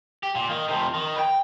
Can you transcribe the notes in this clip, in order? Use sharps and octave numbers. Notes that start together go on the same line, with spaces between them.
G4
A#2
D#3
C3 F3
D#3
B4 G5